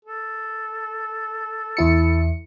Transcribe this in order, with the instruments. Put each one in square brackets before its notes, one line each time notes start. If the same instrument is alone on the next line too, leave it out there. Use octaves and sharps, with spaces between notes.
[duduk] A4
[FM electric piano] E2 E4 C#7